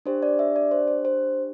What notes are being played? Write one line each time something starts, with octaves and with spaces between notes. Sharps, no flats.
D4 G4 C5
D5
E5
D5
C5
C5
C5